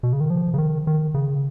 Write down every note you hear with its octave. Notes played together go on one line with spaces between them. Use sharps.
B2
C#3
D#3
F3
C#3
D#3
D#3
C#3